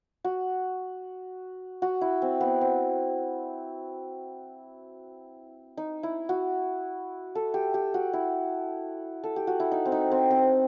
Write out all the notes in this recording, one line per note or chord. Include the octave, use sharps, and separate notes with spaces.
F#4
F#4
E4
C4
B3
C4
D#4
E4
F#4
A4
G4
G4
F#4
E4
A4
G4
F#4
E4
D#4
C4
D#4
C4
C4